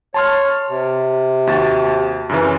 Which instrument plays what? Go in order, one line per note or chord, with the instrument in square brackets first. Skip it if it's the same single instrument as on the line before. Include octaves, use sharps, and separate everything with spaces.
[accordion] C#5 [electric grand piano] A5 C6 F6
[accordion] C3
[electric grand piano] D#2 F#4 A6
F#2 C#3 E3